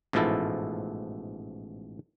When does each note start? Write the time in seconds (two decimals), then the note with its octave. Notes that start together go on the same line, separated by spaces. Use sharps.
0.13 A1 G#2 B2 F3 E4 A4